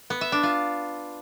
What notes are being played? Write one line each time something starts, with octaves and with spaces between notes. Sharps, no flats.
B3
E5
D4
F4